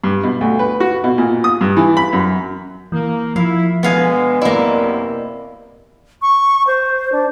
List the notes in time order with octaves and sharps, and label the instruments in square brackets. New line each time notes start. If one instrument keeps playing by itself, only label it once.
[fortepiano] G2
B2
D2
B4
F#4
B2
A#2
D#6
G2
E3
B5
F#2
[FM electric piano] E3 [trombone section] A#3
[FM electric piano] F3 [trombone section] E4 [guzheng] F5
[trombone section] B2 D3 G#3 [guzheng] B3 F5 G#5
[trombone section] F#2 C3 [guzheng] A#3 E4 [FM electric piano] D5 D#5
[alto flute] C#6
C5
D4